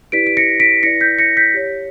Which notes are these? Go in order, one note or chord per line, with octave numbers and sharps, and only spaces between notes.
E4 G4 B4 D5 B6 D7
D7
A#6 C#7
B6 D7
E4 B4 D5 A#6 C#7
G6 B6
A#6 C#7
G6 B6
G4 C#5